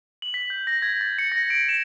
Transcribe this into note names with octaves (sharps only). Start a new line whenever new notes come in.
F#7
B6
G6
A#6
G#6
A6
C#7
A#6
D7
E7